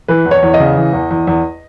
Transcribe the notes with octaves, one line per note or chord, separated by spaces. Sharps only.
E3 B4
E2
C#5
E2
D#5
C#3
E3
E2
E2
E2